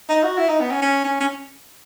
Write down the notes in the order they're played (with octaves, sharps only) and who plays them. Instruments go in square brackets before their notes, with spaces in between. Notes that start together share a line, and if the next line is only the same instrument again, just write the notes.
[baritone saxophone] D#4
F#4
E4
D#4
B3
C#4
C#4
C#4
C#4